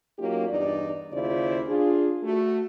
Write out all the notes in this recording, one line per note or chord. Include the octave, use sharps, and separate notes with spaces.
F#3 A#3 C#4 D#4 F4 G4
E2 G2 D#4 D5
D#2 C#3 E4 F4 C5 D5
D4 F4 G#4
A3 F#4